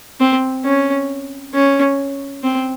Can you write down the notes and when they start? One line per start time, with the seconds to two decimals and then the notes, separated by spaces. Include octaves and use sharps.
0.20 C4
0.65 C#4
1.54 C#4
2.43 C4